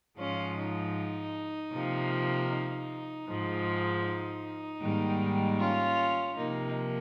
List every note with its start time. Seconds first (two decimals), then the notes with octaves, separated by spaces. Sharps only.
0.17 G#2 F3 G#3 C#4 F4
0.56 D#4
1.72 C3 F3 A#3
2.49 D#4
3.27 G#2 F3 G#3
4.04 D#4
4.81 G#2 D#3 G3 A#3
5.59 C#4 F4
6.36 C3 F3 A#3 D#4